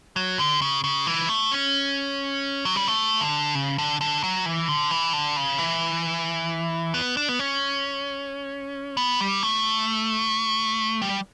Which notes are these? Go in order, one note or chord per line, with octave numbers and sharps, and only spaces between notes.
F#3
D3
C#3
C#3
E3
A3
C#4
F#3
G3
A3
D3
C#3
D3
D3
F#3
E3
D3
E3
D3
C#3
E3
B3
D4
B3
C#4
B3
G3
A3
G3